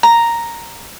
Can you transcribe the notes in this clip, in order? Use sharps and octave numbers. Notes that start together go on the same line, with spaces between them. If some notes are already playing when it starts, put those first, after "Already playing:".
A#5